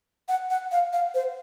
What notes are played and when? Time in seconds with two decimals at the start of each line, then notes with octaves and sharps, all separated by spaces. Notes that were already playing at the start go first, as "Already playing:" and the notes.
0.29 F#5
0.50 F#5
0.72 F5
0.93 F5
1.15 C5